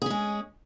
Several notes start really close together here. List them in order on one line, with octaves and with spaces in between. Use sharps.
G#4 C#4 G#3